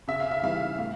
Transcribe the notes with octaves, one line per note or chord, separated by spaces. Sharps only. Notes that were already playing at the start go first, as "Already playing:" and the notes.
C#3 E5
F5
E5
E3 G3 F5
A2 F5